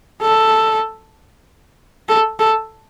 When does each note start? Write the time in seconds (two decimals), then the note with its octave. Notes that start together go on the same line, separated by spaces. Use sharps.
0.22 A4
2.09 A4
2.39 A4